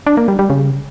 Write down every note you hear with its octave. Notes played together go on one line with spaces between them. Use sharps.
D4
A#3
G3
G3
C#3